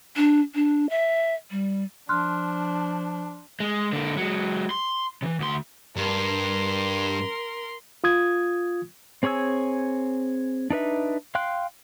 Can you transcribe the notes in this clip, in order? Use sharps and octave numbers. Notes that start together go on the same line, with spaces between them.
D4
D4
E5
G3
F3 D4 C6 F6 F#6
G#3
D3 A#3
F#3 G#3
C6
C3 E3
D2 C6
G2 A#4 C6
F4 D#6 G#6
C4 G#4 C#5 G#5 E6
D4 D#4 B4 E5
F5 G5 C6 F#6